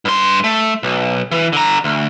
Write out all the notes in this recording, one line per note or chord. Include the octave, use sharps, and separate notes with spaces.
G2 C6
A3
B1
E3
D3 A#5
D2